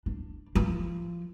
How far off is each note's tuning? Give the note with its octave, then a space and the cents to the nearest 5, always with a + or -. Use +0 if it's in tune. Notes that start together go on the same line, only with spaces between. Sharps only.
D4 +15
F3 -25